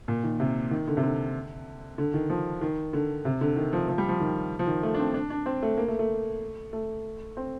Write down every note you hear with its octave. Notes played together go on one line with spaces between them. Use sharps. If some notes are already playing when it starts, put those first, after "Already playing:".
A#2
D#3
C3
D#3
D3
C3
D3
D3
D#3
F3
D#3
D3
C3
D3
D#3
F3
F3
G3
F3
D#3
F3
D#3
A3
D4
C4
D4
D4
C4
A3
A#3
A3
A3
A3
C4